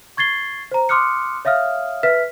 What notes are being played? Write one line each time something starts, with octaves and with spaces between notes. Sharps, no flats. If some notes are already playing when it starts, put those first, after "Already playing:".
C#6 G#6 A6 C7 G7
C5 A#5
C6 D6 D#6 F6 F#6 C#7
C#5 E5 F5 D#6 F6
B4 E5 F6 B6